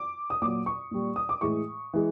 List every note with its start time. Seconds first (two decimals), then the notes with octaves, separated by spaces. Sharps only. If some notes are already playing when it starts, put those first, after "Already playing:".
Already playing: D6
0.30 D#6
0.42 A#2 F#3 D6
0.66 C#6
0.91 A#2 G3
1.16 D#6
1.29 D6
1.41 A2 E3 G#3 C#6
1.93 E3 G#3